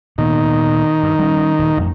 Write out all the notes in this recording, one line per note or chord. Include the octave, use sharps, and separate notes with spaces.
D2 A#2 D#3 B3
G2
G3 C#4
D#1
A1 F2